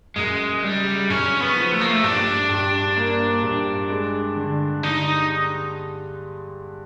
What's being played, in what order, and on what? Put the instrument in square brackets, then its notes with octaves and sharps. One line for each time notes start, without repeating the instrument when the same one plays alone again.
[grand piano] F#2 [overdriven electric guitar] G#3
[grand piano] C#3 [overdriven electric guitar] G3
[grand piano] F#2 [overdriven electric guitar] C#4
[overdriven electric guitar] B3
[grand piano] F3
[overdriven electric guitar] A3
A#3
A3
[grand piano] G2 [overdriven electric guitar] D4
[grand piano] G2
A#3
G2
G#3
D3
[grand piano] D3 [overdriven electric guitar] D#4